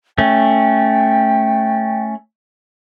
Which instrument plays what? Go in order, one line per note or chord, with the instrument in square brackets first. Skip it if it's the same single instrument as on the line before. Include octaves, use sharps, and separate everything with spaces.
[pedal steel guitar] A3 C#4 [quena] G5